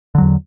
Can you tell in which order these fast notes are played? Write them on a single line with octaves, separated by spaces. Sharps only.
D3 F#3 E2